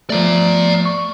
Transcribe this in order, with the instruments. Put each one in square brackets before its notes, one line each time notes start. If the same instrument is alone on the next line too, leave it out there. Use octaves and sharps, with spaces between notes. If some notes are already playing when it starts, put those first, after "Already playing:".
[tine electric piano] F3 A3 [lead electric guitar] D5 A#5
[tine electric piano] C#6